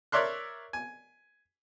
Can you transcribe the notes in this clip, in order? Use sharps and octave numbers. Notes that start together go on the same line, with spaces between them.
A#4 C#5 D5 E5 C6 F#6
G#5